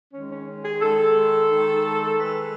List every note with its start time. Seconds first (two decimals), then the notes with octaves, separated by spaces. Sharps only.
0.12 D#3 G#3 C#4
0.30 C#4
0.64 G#4
0.81 D#3 G#3 A4
1.50 D#3 G#3
2.19 D#3 G#3 B4